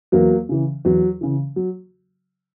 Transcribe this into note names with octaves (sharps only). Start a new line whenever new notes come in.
E2 F#3 A#3
C#3 E3
E2 F#3
C#3 E3
F#3